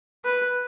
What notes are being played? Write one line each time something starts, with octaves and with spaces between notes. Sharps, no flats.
B4